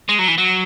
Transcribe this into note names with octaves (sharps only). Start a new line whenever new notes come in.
G#3
F#3
E3
F#3